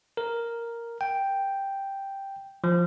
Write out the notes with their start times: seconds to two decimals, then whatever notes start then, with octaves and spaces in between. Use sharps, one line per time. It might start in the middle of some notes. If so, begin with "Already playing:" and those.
0.17 A#4
1.01 G5
2.64 F3